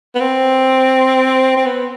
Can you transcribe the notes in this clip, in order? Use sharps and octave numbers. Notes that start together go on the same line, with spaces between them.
B3
C4
C4
B3